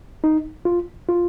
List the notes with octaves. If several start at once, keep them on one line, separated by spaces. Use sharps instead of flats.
D#4
F4
F4